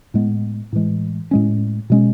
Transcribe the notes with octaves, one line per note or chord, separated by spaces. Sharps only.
A2 G#3 B3
A2 E3 G#3
A2 G#3 C#4
B2 G#3 C#4